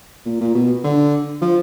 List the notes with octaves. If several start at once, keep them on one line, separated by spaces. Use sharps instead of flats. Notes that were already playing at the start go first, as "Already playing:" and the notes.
A#2
A#2
B2
D3
F3